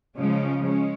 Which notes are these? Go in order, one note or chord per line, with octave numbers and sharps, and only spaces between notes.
C#3 F3 G#3 C#4
G#3 C#4